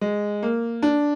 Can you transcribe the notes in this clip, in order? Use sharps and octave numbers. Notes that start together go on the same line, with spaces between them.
G#3
A#3
D4